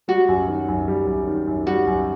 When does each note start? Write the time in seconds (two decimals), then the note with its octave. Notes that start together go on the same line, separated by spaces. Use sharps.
0.08 G3 F#4
0.29 F#2
0.48 D#3
0.69 F#2
0.88 G3
1.07 F#2
1.27 D#3
1.48 F#2
1.67 G3 F#4
1.87 F#2